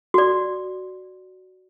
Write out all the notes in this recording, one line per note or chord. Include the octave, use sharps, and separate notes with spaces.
F#4 D5